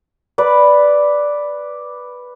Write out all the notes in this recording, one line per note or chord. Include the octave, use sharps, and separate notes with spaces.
B4 D5